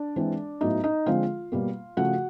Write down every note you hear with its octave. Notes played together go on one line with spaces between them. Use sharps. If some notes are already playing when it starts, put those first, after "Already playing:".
Already playing: D4 D5
E3 G#3 C4
A2 F#3 B3 D#4 D#5
D#4 D#5
D3 F3 G#3 C4 F4 F5
B2 G3 A#3
C#3 F3 A3 F#4 F#5